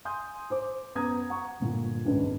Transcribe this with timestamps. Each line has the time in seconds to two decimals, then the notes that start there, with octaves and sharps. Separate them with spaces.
0.05 G#5 C6 D#6 G6
0.50 C5 D6
0.95 F#2 B3 A#5 D#6 G#6
1.30 F#5 A#5 C#6
1.60 G1 A#2 F4
2.05 G#1 C#2 F#2 C4 D4 B4